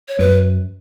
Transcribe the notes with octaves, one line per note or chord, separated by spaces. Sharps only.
C#5
F#2 B4